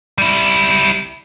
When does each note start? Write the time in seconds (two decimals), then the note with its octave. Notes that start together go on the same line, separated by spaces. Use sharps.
0.18 G3 E4